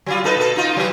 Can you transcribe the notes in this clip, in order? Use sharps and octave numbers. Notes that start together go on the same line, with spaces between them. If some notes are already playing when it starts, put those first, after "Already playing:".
F#3 G3 F4
D#4 A4 B4
B2 A4
D#4 F4
E3 F#3